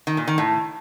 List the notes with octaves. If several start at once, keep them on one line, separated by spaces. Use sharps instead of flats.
D#3
A#2
D#3
A2